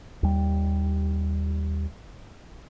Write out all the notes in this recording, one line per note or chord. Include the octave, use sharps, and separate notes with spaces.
D#2 G3